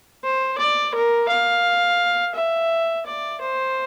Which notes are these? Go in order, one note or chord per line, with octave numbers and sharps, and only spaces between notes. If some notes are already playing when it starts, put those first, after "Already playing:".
C5
D5
A#4
F5
E5
D5
C5